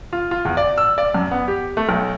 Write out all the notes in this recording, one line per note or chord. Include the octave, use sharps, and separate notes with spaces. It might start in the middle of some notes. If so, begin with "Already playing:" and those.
F4
F4
E2
D5
E6
D5
F#2
B3
G4
A3
B1